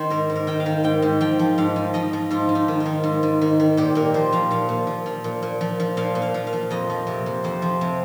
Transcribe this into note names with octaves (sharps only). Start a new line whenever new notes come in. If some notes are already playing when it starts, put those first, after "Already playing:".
Already playing: D#3 C5
G#2 A#4
G#2
A#4
D#3 G5
F5
D#3
G#2 G5
G#2
F3 G5
F3
G#2 F5
G#2
F3 D#5
F3
G#2 F4
G#2
D#4
D#3
F4
D#3
G#2
G#2
D#3
D#3
A#2 G4
A#2 A#4
F3 C5
F3 F5
A#2 F5
A#2
F3
F3
A#2
A#2
F3
F3
A#2 F5
A#2
F5
F3
F5
F3
F2 D#5
F3
C3
F2
F2 C5
F3
C3